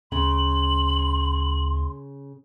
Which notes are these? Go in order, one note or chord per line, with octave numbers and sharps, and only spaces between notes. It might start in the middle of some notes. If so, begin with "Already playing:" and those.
D2 C#3 C6 F#7